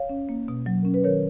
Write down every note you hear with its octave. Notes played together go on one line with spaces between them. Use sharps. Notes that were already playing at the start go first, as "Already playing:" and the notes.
Already playing: C#5 F5
C#4
A#3
B2
F#3
C#4 A#4
B4
D#3 A#4 C#5